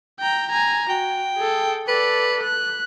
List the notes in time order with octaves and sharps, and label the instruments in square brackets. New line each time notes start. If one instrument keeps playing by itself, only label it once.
[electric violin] G5 A#5
G#5 A#5
[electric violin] F#4 [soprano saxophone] G5
[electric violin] G#4 A4
[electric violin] A4 D5 [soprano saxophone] B4
[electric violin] F#6